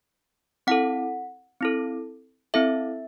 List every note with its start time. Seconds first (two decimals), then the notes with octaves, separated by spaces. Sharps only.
0.67 C4 E4 A4 F#5
1.61 C4 E4 A4
2.54 C4 E4 A4 E5